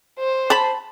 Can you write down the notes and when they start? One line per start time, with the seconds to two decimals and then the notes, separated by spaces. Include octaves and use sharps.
0.19 C5
0.50 A5 B5